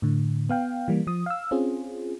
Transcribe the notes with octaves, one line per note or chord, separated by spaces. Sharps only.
A2 D3
B3 F5 G5
E3 G3 A#3
F3 D#6
F5 E6
C4 C#4 F4 G#4